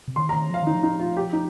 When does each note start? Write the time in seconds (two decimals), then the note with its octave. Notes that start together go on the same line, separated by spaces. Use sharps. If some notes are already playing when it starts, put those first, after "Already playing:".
0.08 C3
0.16 D#3 C6
0.29 D#3 A#5
0.50 F3 F5
0.62 D#3 D#4
0.74 F3
0.83 D#4
1.00 F4
1.17 G4
1.33 D#4